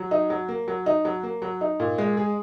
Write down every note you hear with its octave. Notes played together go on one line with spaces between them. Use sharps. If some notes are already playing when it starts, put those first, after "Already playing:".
Already playing: F#3
D#4
F#3
A#3
F#3
D#4
F#3
A#3
F#3
D#4
A#2
G#3
G#4